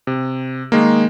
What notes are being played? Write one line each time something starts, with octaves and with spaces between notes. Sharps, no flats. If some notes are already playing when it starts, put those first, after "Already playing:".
C3
D#3 G#3 A#3